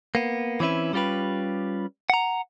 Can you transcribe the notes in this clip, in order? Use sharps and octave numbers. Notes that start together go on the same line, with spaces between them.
A#3 B3
E3 C4 C#4 E4 B4
G3 C#4 F4 G4 B4
F#5 A#5